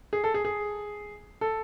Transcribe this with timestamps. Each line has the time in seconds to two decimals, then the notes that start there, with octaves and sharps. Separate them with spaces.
0.13 G#4
0.24 A4
0.34 G#4
0.45 G#4
1.41 A4